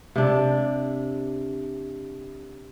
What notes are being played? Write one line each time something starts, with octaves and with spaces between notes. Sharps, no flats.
C3 D4